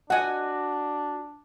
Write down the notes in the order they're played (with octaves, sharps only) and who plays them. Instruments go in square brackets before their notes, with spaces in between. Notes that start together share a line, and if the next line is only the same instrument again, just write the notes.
[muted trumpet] D4 [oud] F#4 D#5 [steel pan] F#5 G#5